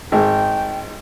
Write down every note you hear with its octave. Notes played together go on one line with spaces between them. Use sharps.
G#1 G#3 G5